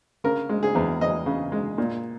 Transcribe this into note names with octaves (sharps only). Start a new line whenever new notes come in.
C#3 A#4
G#3
G#4
E2
E2 D#5
C#3
G#3
A#2